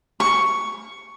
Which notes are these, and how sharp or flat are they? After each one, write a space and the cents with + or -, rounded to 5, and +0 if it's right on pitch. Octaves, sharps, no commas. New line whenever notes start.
C#6 +5